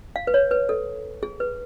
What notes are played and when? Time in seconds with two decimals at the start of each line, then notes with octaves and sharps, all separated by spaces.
0.16 F5
0.27 B4
0.34 C#5
0.51 B4
0.69 A4
1.23 G#4
1.40 B4